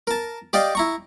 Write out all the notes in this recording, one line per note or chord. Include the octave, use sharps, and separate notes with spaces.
A#4 A5
G4 D5 D#5 F5 G5
E4 A#5 C#6